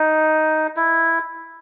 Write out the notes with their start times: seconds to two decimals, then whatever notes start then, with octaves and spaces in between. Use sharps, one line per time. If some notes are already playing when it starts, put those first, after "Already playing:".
Already playing: D#4
0.77 E4